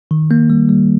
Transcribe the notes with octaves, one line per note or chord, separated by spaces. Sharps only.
D#3
A#3
G3
G3